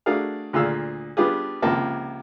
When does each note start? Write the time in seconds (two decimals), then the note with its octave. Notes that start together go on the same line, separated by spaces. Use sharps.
0.06 A3 D4 F#4 G#4 A#4 F5
0.53 D2 A#2 G#4 F5 E6
1.17 G3 B3 D4 F4 G4 G#4
1.62 C#2 C3 F3 A#3 A5